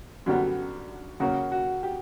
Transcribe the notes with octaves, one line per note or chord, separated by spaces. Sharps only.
F#2 D3 G3 B3
C#3 F#3 A#3 F#4
F#4
G4